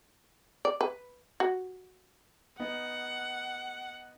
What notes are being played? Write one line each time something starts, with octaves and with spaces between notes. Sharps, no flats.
D5
B4
F#4
B3 D#4 F#5